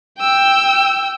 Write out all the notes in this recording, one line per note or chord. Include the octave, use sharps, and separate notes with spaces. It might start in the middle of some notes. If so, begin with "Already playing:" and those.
G5 E6